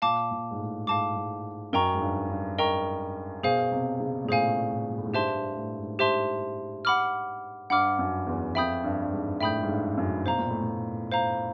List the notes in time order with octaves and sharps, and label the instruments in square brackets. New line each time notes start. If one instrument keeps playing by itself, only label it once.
[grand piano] A#2 [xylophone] F5 A5 D6
[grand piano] A#2
G#2
A2
[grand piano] G#2 [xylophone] F5 A5 D6
[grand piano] G#2
[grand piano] F#2 [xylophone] A#4 D#5 G5 A#5 C#6
[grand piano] G#2
G2
G2
[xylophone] A#4 D#5 G5 A#5 C#6
[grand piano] B2 [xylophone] G#4 C5 F5 G#5
[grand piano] C3
C#3
A#2
[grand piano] A2 [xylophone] G#4 C5 F5 G#5
[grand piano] A2
A#2
A2
G#2
[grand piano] G2 [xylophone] G4 C5 E5 A5 C6
[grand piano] G2
A2
G#2
[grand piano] G#2 [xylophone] G4 C5 E5 A5 C6
[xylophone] F#5 B5 D6 F6
[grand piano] G2 [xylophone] F#5 B5 D6 F6
[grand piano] F#2
E2
[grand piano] F2 [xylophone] E5 G5 B5 D#6 G6
[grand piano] G2
G2
G#2
[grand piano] A2 [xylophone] E5 G5 B5 D#6 G6
[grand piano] G#2
G2
F#2
[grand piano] B2 [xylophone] C5 F5 A#5
[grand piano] A#2
A2
A#2
[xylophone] C5 F5 A#5